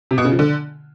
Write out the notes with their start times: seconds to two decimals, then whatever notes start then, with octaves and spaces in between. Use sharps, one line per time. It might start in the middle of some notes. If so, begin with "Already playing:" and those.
0.11 C3
0.18 B2
0.25 C#3
0.32 F3
0.39 D3